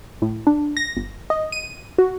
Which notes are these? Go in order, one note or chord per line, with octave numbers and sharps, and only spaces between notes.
A2
D4
A#6
G1
D#5
D#7
F#4